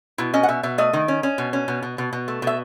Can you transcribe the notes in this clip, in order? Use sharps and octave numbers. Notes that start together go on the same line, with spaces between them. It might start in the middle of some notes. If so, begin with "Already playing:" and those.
B2 E4
C#4 D#5
F#5
B2 E5
B2 E5
A3 D#5
D#3
C#4
C#4
B2
C#4
B2
B2
B2
B2
A3
B2 E5